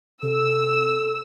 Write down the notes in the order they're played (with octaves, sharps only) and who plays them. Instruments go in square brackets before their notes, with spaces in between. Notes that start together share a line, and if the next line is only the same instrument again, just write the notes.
[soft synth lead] C3 [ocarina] A4 [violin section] E6